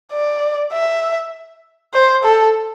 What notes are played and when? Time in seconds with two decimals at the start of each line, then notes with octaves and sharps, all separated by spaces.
0.13 D5
0.73 E5
1.94 C5
2.24 A4